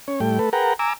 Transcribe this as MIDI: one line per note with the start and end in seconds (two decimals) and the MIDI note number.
0.08 0.20 61
0.08 0.20 73
0.20 0.39 45
0.20 0.39 55
0.20 0.39 57
0.20 0.39 79
0.39 0.50 57
0.39 0.50 69
0.39 0.50 71
0.53 0.74 68
0.53 0.74 70
0.53 0.74 71
0.53 0.74 78
0.53 0.74 79
0.53 0.74 82
0.79 0.93 80
0.79 0.93 82
0.79 0.93 86
0.79 0.93 88